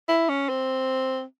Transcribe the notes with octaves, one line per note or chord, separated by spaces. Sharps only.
E4
C#4
C4